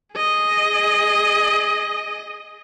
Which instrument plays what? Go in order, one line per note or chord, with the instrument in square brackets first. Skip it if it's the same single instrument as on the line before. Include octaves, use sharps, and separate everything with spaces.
[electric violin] G#4 D#5